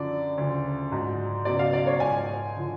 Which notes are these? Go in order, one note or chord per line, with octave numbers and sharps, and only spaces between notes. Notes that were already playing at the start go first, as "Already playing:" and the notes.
Already playing: F#2 D3 F3 D5
D2 C#3 F3
G#2 F#3
C#2 B2 F#3 D5
F5
D5
C#5
G#2 F3 G#5
D3 F3